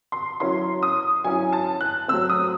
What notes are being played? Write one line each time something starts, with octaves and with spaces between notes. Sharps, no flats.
C6
F#3 C#4 E4 C6
D#6
F#3 C#4 E4 G#5
A5
F#6
F#3 A3 C4 E6
D#6